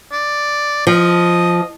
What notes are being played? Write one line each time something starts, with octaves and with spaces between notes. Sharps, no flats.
D5
F3 D#5